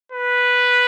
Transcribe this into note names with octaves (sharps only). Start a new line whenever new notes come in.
B4